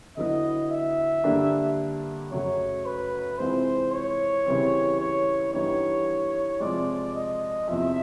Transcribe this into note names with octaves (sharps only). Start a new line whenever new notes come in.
D3 F#3 B3 E4 D#5
E5
G2 D3 G3 A#3 D4
F#2 C#3 F#3 A3 C#5
B4
C3 E3 G#3 C4 F4 C5
C#5
C#3 E3 G3 C4
C#5
G2 E3 G3 B3 D#4 C#5
C3 F3 G#3 D5
D#5
E2 C3 F3 E5